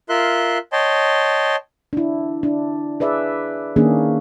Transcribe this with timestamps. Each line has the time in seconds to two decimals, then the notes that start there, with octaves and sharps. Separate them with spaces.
0.09 F4 A#4 E5 C6 F#6
0.73 C#5 D#5 G5 A5 C6
1.93 D4 E4
2.43 D4
3.00 G#4 B4 D5 E5
3.76 D#3 A#3 C#4 D4 G#4